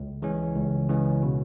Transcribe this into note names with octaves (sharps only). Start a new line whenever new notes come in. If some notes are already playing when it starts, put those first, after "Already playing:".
Already playing: C#2
C#3 E3 G#3 C#4
C#2
C#3 E3 G#3 C#4
B2